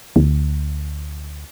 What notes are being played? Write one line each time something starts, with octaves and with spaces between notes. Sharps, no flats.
D2